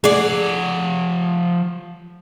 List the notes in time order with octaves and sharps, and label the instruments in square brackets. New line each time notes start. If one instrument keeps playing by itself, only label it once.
[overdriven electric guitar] F3 F#5 [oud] G#4 D5